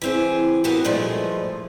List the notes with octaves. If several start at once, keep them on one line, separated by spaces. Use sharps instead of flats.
E3 C4 G#4
A#3 B3 F#4 G4 A#4
G2 A#2 F3 G#3 A3